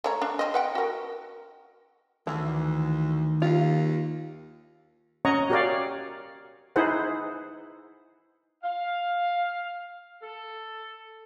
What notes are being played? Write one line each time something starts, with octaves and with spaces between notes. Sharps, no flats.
A3 C#5 A#5
D4
C4 D#5
B4 F#5 G5
F#4 A#4
D2 D#3 E3
D#2 F4
C#4 C#5 D#5 F#5 A#5 C#6
F#4 G4 A#4 C#5 D5 F5
D#4 E4 G#4 B4 C5 F#5
F5
A4